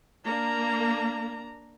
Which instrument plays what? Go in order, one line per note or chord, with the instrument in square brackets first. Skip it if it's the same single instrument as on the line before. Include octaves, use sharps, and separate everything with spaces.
[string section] A#3 [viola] D4 A#5